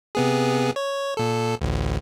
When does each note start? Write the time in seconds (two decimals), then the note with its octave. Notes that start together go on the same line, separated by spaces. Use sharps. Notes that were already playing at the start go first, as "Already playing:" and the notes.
0.15 C3 B3 G#4
0.76 C#5
1.17 A#2 A4
1.61 A1 D2